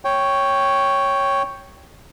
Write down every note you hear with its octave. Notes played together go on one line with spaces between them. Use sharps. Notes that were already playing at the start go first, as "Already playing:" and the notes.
C#5 G5